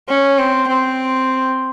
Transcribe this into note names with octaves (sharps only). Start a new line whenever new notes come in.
C#4
C4
C4